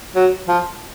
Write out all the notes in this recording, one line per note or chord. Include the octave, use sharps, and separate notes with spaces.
F#3
F3